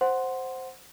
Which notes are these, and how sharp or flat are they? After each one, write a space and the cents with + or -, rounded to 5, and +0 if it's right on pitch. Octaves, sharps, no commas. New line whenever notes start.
C5 +0 F#5 +0 C6 +0